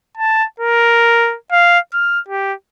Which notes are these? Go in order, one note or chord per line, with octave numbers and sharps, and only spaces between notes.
A5
A#4
F5
F6
G4